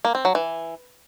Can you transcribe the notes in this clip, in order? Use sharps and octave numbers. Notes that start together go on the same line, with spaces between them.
A#3
C4
F#3
E3